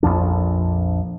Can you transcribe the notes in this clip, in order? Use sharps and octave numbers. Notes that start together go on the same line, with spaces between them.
A#1 F2 F3 D4